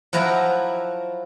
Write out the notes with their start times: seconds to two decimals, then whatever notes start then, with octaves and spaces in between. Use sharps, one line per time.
0.13 F3 F#3 E4 A#5